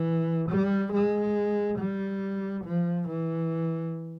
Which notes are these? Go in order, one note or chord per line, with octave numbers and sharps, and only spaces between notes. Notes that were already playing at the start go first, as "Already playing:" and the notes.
Already playing: E3
G3
G#3
G3
F3
E3